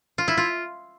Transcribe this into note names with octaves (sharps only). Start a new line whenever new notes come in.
F4
E4
F4